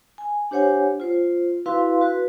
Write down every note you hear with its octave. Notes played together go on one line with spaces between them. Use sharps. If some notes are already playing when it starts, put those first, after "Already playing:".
G#5
D4 G4 C5 C#5 F#5 G#5
F4 C5
E4 F#4 B4 F5 C6
F#4 B4